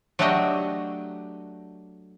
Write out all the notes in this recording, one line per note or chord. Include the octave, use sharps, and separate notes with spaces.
F#3 A3 D4 F#4 G4 D#5